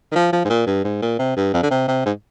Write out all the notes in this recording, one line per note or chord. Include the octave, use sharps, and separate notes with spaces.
D#3
F3
F3
G#2
A#2
G2
G#2
A#2
C3
G2
F2
D3
C3
C3
G#2